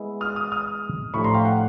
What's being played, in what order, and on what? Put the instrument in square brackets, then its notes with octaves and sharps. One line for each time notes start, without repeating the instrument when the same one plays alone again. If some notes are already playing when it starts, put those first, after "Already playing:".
Already playing: [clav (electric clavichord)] G#3 B3 E4
[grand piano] D#6 F6
D#6 F6
D#6 F6
[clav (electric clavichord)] A2 F3 A3 D4 G4 [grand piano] B5 C#6
[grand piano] A#5 C6
F5 G5
F#5